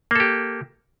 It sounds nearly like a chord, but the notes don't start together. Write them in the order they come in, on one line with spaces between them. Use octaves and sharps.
A#3 A4 G4